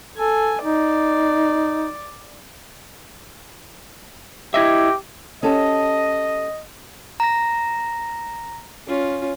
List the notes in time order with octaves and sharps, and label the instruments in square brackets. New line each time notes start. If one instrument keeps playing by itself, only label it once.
[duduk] A4 [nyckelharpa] G#5
[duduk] D#4 [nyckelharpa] D5
[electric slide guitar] E4 D#5 E5 [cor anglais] G4
[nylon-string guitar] C#4 G4 A4 [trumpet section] D#5
[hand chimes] A#5 A#6
[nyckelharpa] C#4 F4